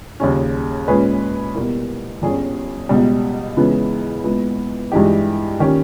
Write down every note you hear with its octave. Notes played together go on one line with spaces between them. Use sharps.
D#2 C#3 G3 C#4
A#2 G#3 C#4 G#4 B4
B2 G3 A#3 E4
G1 G2 G3 C#4 G#4
C#2 B2 G3
C#2 C#3 E3 G#3 B3
A#2 G#3 B3 E4
G2 E3 G#3 D#4 G4
D#3 A#3 C#4 G4